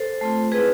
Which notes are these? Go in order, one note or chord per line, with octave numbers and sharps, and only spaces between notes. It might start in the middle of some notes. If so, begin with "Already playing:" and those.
Already playing: A4 C5
A3 C4 F4
G#3 C4 E4 G#4 B4